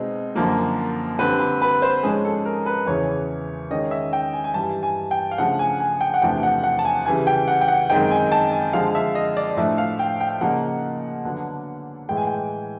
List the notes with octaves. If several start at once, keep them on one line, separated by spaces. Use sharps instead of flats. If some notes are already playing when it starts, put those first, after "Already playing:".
Already playing: B2 G#3 C4 D#4
F#2 D3 F3 A#3
D3 G3 C4 B4
B4
B4
C5
G#2 F3 G#3 C#4 G#4
A4
A#4
B4
E2 C#3 E3 C#5
D#3 G#3 C#4 D#5
E5
G5
G#5
G#5
G2 E3 G3 A5
G#5
G5
F5
C#3 F3 A3 D4 F#5
G#5
G#5
G5
F#5
E2 C3 F3 A3 D4 G5
F#5
F#5
A5
G#5
C#3 E3 G3 G#5
G5
F#5
G5
F#5
F#2 D#3 G#3 C4 D#4 G5
G#5
A5
G#5
D3 F3 G#3 F5
E5
D#5
D5
A2 F3 A3 D4 E5
F5
G5
G5
C#3 F3 A#3 D#4 F#5
D3 F#3 B3 D4
A2 E3 G#3 G5
G#5
G5